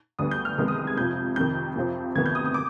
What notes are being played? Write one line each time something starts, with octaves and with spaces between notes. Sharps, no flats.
D2 D3 G3 B3 D#6
G6
F6
C2 C3 D#3 G#3 B3 F6
D#6
D#6
G#6
F2 C3 F3 G6
F2 C3 D#3 G6
F2 C3 F3 C4
D2 C3 D#3 B3 G#6
G6
D#6
D#6
D6